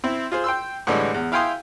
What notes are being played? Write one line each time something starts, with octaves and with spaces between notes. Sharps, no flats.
C4 E4
F4 G#4 C5
G5 C6 E6
A2 D3 E3 G3 G#3
E2
E4 F5 G5 G#5 C6 D#6